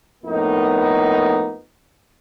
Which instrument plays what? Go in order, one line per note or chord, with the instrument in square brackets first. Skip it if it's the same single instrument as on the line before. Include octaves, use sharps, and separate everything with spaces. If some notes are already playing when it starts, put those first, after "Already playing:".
[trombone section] F2 A2 A#3 B3 D#4